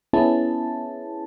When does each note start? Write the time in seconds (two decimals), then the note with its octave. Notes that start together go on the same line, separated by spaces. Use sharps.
0.13 B3 C#4 E4 G#4 A5